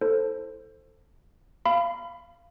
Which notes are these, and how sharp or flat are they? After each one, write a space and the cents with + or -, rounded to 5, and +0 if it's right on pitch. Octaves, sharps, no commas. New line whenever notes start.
E4 +0 A4 +10 C5 +5
F5 -20 B5 +25